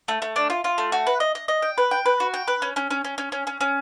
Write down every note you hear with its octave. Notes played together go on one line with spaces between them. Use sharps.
A3
A3
D4
F4
F4
A3
F#4
B4
D#5
D#5
D#5
G5
B4
G5
B4
F#4
G5
B4
C#4
C#4
C#4
C#4
C#4
C#4
C#4
C#4